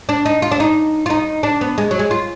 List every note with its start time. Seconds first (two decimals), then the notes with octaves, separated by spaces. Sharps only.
0.09 D4
0.26 D#4
0.42 F4
0.52 D4
0.60 D#4
1.06 F4
1.10 D#4
1.43 D4
1.61 B3
1.78 G#3
1.91 F#3
1.99 G#3
2.11 F4